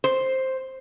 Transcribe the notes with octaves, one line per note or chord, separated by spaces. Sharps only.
C5